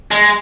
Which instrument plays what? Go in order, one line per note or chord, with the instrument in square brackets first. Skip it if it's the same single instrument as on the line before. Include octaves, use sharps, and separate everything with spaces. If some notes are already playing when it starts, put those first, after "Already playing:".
[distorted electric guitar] G#3